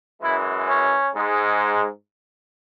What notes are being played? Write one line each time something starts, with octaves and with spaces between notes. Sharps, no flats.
F#2 E3 G#3 E4
C#4
G#2 G#3